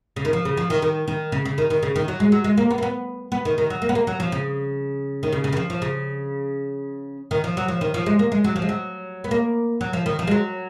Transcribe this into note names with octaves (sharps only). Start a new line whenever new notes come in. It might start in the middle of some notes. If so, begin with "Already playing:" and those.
C#3
D#3
F3
C#3
F3
D#3
D#3
D#3
C#3
C#3
D#3
D#3
C#3
D#3
F#3
G#3
F#3
G#3
A#3
B3
A#3
B3
B3
D#3
D#3
F#3
A#3
B3
A#3
F#3
F3
C#3
D#3
C#3
C#3
D#3
F3
F3
C#3
D#3
F3
F#3
F3
D#3
F3
G#3
A#3
G#3
F#3
F3
G#3
F#3
B3
A#3
F#3
F3
D#3
F3
G#3
F#3